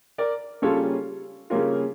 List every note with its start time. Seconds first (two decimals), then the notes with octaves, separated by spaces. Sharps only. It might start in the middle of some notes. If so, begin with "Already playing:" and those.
0.18 A#4 D5
0.62 C#3 G3 A#3 C#4 F4 A4 C#5
1.50 C#3 G3 A#3 C#4 F4 A#4